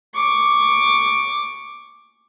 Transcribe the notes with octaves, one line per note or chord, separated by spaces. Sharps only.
C#6 D6